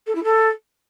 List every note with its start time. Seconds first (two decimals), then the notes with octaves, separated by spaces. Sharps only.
0.07 A4
0.15 E4
0.24 A4